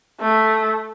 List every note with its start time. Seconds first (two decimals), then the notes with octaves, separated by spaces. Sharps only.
0.21 A3